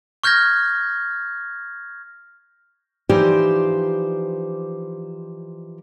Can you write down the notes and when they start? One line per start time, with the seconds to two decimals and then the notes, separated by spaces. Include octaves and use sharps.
0.24 C#6 F6 G6 G#6 A#6
3.09 E3 F3 D#4 G4 C5 D5